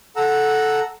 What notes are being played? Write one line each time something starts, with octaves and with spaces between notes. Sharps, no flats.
A4 F#5 A#5 E6